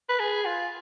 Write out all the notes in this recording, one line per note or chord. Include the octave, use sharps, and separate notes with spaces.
B4
G#4
F4